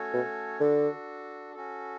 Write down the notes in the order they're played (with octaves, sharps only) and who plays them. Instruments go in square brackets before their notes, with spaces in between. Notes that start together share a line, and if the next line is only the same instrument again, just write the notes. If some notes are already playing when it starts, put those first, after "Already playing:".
Already playing: [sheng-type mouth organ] A3 C#4 F#4 A4 C#5
[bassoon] B2
[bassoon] D3 [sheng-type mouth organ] D4 F#4 A4
[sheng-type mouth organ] C#4 F#4 A4